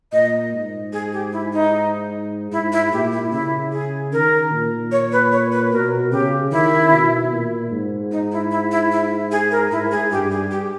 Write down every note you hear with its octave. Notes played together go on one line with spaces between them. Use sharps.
A#2 D#5
G#2
G#4
G4
E4
D#4
G#2 E4
E4
A#2 G4
E4
C#3 E4
G#4
D#3 A#4
A#2
C#5
B4
C#5
B4
B2 A#4
C#3 G4
D#3 E4
B2
A#2
G#2
D#4
E4
E4
E4
E4
G#4
A#4
G#2 E4
G#4
G2 G4
G#4
G4